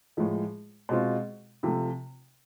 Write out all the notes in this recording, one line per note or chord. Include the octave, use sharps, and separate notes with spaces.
A2 F3 G#3
B2 G#3 C4 F4
C3 F3 A3